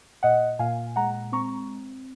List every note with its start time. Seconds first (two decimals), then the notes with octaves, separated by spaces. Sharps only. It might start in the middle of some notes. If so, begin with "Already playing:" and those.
0.23 A#2 D#5 F#5
0.59 A#2 F5 G#5
0.96 G#3 F#5 A#5
1.32 C4 A#5 C#6